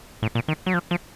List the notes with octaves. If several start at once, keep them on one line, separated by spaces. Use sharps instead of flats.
A2
A#2
D#3
F#3
F3
F3